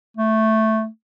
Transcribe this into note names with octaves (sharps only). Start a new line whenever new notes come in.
A3